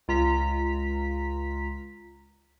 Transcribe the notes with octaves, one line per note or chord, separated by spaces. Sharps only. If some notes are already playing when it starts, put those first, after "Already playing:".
C#2 F4 A#5 B6